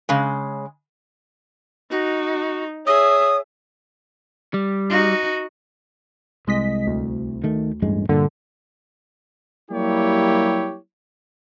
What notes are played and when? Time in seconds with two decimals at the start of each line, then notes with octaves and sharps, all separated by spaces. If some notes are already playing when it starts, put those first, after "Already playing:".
0.09 C#3 G#3
1.91 D#4 F#4
2.86 G#4 C#5 E5 D#6
4.54 G3
4.89 D#4 F#4
6.47 C2 G#3 D#5 B6
6.87 D2
7.44 D#3 A3
7.82 A1 G2 G#3
8.09 G2 A#2 D3 A#3
9.71 F#3 G3 A#3 E4 G4 C#5